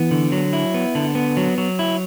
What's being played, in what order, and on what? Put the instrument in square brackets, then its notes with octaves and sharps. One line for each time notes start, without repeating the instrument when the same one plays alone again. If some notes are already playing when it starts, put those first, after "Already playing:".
Already playing: [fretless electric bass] E3 [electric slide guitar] B3
[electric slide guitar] D3
F#3
E4
B3
D3
B3
F#3
F#3
E4